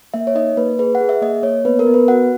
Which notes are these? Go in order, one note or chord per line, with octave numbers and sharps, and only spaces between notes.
A#3 E5
C#5
D#4 D#5
A#3 B4
G#4 B4
F#5
G#4
E5
A#3 D#5
A#3 C#5
B3 B4
A#4
B3
B4
F#4 F#5